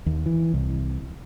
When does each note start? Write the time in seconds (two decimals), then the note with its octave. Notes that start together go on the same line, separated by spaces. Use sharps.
0.06 D#2
0.26 E3
0.54 C2